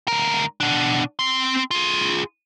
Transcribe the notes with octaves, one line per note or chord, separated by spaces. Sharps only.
D2 A#4
B2 D4
C4 C6
F4 G#4